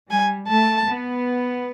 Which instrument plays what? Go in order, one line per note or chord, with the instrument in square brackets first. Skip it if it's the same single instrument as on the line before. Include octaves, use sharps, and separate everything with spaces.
[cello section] G3 [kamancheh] G#5
[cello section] A3 [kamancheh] A5
[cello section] B3